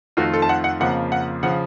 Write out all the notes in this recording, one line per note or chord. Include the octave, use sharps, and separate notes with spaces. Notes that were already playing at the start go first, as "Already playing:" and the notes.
F2 D#3 A3 C4 F4 F#4
A4
A5
F#5
F#5
F2 C#3 F3 A#3 F#5
F#5
C#3 F3 F#5